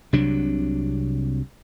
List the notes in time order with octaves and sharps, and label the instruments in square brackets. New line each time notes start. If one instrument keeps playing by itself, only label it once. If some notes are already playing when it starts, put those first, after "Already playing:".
[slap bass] C2 C3 F#3 D4